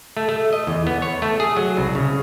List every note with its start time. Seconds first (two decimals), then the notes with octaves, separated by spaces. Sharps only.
0.17 A3
0.29 A3
0.53 D#5
0.67 E2
0.87 B3
1.02 C#5
1.22 A3
1.40 G#4
1.57 F#3
1.77 C2
1.95 C#3